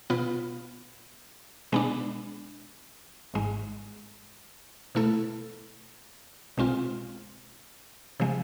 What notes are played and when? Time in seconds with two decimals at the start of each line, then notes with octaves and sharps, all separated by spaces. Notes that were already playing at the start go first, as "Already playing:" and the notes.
0.10 B2 B3 F4 B4
1.72 B2 G#3 B3 D4
3.34 G#1 G#2 G#3
4.95 B2 A3 E4 A4
6.58 B1 B2 G#3 C4 F4
8.20 C3 F3 G#3